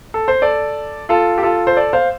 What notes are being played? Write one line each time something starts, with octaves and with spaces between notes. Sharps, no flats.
A4
C5
A4 D5
F4 A4
G4
F4 A4
C5
A4 D5
C5 F5